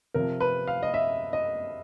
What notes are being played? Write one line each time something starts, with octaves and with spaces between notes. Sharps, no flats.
C3 F3 A#4
B4
F5
D#5
E5
D#5